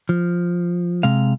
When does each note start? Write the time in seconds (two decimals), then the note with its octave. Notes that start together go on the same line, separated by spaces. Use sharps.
0.09 F3
1.03 C3 G#3 F5